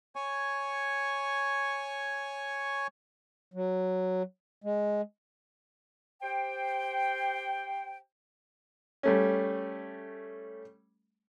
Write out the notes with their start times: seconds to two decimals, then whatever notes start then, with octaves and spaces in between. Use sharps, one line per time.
0.16 C#5 G#5 C#6
3.54 F#3
4.64 G#3
6.22 G4 C5 G5
9.03 G3 A3 C#4